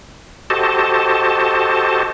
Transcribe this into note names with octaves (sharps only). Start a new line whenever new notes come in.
F#4 G4 A4 C5 D#5 A5